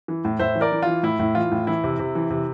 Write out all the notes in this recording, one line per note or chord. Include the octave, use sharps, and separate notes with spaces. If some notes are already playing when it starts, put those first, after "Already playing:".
E3
A2
A2 C5 E5
E3
A#4 D5
E3
E3 F4
A2 E4
A2
E3 F4
A2
E3 E4
C3
C3
E3
C3